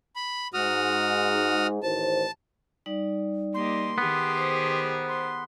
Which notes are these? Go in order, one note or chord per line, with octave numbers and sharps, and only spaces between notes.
B5
G#2 F#4 D#6 F6
A1 D#3 C5 A5
G3 D#4 D5
A#3 G4 D#5 C6
D#3 B3 G4 G#4
C5 A#5
C6